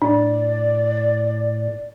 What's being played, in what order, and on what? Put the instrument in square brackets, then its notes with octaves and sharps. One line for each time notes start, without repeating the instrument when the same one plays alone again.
[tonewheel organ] A2 [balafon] D4 [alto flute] D5